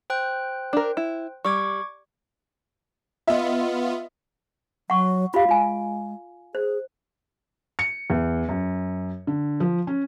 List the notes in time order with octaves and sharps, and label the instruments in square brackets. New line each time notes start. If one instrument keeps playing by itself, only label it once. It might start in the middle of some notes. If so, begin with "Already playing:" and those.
[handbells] C5 G5 F#6
[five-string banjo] D4 A#4
E4
[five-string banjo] G3 [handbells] C#6 D6 G#6
[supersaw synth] B3 F4 [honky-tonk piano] D#5 E5
[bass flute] F#3 [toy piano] F#5 C#6
[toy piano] F4 F5 [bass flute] G4
[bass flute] G#3 [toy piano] F4 G#5
[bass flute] G#4 [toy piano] C5
[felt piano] C#7
E2
F#2
D3
F3
C#4